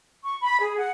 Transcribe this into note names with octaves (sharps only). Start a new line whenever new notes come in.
C#6
B5
G#4
F#5